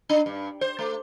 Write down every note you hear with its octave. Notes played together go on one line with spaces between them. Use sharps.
D4
G2
C5
A3